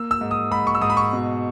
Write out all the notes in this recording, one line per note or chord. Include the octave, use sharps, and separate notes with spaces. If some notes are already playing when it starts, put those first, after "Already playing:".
Already playing: A#3 E6
E6
G#2
D#6
G#2 B5
C#6
E6
G#2 D#6
B5
C#6
B2